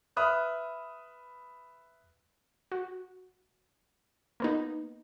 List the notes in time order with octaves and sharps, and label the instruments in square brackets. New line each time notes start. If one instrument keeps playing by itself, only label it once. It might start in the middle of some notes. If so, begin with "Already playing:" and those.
[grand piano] B4 E5 B5 D#6 F6 F#6
[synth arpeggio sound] F#4
A#3 B3 D#4